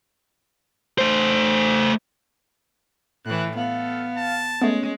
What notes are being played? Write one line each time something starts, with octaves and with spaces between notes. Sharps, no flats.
A3 C5
A2 E3 F#6
B3 A4 F5
A5
G#3 A3 B3 C#4